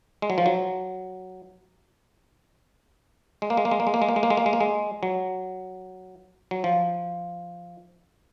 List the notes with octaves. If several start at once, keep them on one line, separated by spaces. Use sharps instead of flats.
G#3
F#3
F3
F#3
G#3
A#3
G#3
A#3
G#3
A#3
G#3
A#3
G#3
A#3
G#3
A#3
G#3
A#3
G#3
A#3
G#3
F#3
F#3
F3